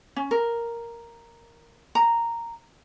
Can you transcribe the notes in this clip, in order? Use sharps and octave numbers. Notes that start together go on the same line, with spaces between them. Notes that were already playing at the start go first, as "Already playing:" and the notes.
C#4
A#4
A#5